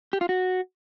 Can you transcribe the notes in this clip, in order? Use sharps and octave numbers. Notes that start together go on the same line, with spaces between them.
G4
F4
F#4